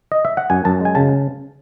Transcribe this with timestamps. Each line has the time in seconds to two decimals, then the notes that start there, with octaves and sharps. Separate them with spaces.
0.12 D#5
0.25 E5
0.37 F#5
0.50 F#2 G#5
0.65 F#2 A5
0.81 G#3 G#5
0.95 C#3 A5